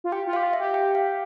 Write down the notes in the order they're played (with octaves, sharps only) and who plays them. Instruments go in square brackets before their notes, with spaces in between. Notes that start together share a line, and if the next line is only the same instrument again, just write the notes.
[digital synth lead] F4
[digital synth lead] G4 [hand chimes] G5
[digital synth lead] F4
[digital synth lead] G4 [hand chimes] F5
[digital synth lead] F4
[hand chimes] E5
[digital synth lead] G4
[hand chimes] G5
F5